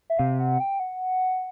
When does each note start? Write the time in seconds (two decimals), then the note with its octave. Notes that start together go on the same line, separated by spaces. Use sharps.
0.10 E5
0.19 C3 F5
0.40 F#5
0.60 G5
0.80 F#5